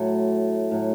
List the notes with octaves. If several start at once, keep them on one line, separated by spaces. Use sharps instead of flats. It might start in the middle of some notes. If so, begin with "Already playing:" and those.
Already playing: A2 F#3
A2 F#3